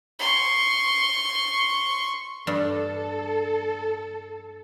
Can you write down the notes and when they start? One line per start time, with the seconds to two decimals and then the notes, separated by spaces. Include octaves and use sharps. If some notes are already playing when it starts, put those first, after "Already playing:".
0.19 C6 C#6
2.47 G2 D4 A4